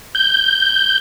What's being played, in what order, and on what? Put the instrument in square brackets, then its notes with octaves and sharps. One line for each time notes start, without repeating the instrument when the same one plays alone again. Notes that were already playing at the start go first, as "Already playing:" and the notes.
[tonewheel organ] G6